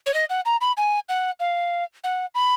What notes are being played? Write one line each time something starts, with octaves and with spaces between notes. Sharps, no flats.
C#5
D#5
F#5
A#5
B5
G#5
F#5
F5
F#5
B5